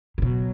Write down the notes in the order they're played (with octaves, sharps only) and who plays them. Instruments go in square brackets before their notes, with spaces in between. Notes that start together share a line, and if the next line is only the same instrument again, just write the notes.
[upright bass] A2
[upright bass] B2 [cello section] F#3